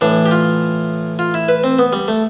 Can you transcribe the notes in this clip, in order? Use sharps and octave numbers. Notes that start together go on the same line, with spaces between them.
A2 E3 D4
G4
F4
F4
E4
B4
C4
B3
G3
A3